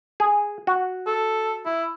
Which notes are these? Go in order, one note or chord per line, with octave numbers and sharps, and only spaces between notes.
G#4
F#4
A4
E4